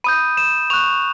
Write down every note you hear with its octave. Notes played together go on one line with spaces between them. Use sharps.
B5 D#6 G6 D#7
E7
C#6 F#6 F7